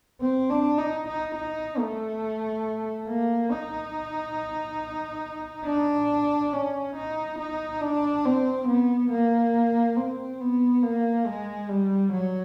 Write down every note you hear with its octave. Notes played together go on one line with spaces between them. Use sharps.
C4
D4
D#4
D#4
D#4
A3
A#3
D#4
D4
C#4
D#4
D#4
D4
C4
B3
A#3
C4
B3
A#3
G#3
G3
F#3